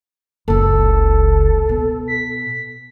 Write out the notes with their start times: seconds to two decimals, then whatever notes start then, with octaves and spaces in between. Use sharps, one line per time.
0.48 F#1 C#2 A4
1.69 B2
2.08 B6